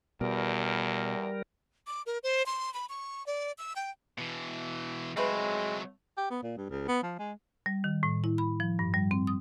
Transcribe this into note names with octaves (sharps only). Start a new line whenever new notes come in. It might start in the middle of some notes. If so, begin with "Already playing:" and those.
E2 B2 G3 A#4
D6
A#4
C5
C6
B5
C#6
D5
E6
G5
B2 E3
F3 F#3 G#3 A3 C4 B4
G4
B3
A#2
G2
C#2
B3
F3
G#3
G3
D#3
A2
E4
B5
F3
G2
G3
C4
D#6